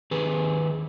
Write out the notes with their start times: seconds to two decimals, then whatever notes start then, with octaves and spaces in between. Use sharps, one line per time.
0.11 D#3 G4 G#4 B4